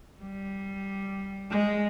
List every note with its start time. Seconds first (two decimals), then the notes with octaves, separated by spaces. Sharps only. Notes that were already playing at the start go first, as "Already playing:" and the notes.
0.21 G3
1.51 G#3